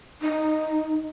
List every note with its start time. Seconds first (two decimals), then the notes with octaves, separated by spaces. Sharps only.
0.22 D#4